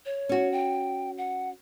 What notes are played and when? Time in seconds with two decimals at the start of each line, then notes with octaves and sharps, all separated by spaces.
0.06 C#5
0.29 C#4 F#4
0.52 G5
1.18 F#5